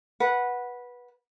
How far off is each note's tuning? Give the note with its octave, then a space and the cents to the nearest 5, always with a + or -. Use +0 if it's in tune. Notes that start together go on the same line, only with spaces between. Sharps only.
B4 -15 F#5 -5